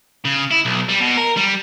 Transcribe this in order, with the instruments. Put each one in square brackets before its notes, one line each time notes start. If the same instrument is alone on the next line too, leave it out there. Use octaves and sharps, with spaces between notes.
[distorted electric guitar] C#3
E4
B1
G3
B2
A#4
G3